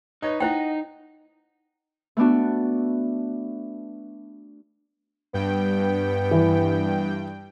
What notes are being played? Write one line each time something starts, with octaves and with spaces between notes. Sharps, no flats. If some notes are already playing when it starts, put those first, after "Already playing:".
D#4 B4 C#5 D#5
D#4 E4 C5 D#5 F#5 G5
A3 B3 D4 F#4
G2 B3 G5
E3